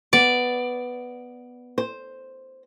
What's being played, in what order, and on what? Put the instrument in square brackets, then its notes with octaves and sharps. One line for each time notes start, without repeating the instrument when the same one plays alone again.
[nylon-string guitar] B3 [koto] D5
[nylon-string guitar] C5